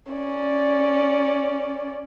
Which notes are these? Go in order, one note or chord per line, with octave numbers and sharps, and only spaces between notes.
C#4 D5